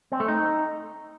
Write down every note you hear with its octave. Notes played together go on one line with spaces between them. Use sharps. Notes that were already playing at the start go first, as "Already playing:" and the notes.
C4
A3
D#4